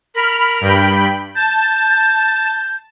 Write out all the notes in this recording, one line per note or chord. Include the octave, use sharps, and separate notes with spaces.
A#4 B5 F6
G2 G5 B5
A5 G6